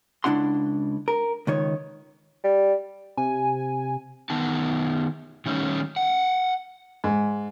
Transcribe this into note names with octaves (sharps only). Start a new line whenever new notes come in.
C#2 E3 D4 E4 F#5 C6
A#4
C#2 D#3 C#5
G3
C3 G#5
D#3 B3 D#4 A5
D#3 G3 A3 C#4 D#4
F#5 G5
G#2